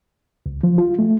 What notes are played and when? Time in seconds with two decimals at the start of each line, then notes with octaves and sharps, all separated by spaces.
0.46 C#2
0.63 F3
0.78 F4
0.99 A3